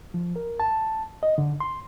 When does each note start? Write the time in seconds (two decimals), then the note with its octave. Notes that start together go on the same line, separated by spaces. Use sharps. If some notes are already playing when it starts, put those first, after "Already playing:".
0.14 F3
0.36 A#4
0.60 A5
1.23 D#5
1.38 D3
1.60 C6